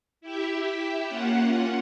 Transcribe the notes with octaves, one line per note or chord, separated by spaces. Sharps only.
E4 G4 E5
A#3 C#4 F4 F#5